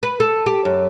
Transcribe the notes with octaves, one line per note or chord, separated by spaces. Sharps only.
B4
A4
G4
F#2